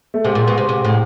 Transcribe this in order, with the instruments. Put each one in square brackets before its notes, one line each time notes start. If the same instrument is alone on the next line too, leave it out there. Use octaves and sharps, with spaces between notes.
[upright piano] A3
[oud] C3 [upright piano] G#3
[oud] A#2
B2
C3
C3
A2